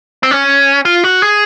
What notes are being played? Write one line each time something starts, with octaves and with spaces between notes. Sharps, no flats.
C4
C#4
F4
F#4
G#4